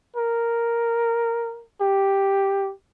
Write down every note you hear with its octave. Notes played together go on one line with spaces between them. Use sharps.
A#4
G4